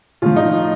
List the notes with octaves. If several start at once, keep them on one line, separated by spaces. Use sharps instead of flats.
A2 F3 F4
D#4